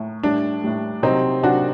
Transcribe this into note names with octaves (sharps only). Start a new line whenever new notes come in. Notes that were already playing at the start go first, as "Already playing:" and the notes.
Already playing: A2
A2 G3 D4
A2 G3
C3 F#3 C4 D#4
C3 F#3 D4 F#4